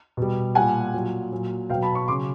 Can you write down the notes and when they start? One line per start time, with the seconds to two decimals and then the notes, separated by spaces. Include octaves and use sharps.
0.17 B2 G3
0.55 A#2 G3 F#5 G#5
0.94 A#2 F#3
1.32 A#2 F#3
1.70 B2 F5 G5
1.74 F#3
1.82 A5 B5
1.95 B5 C#6
2.08 C#3 F#3 C6 D6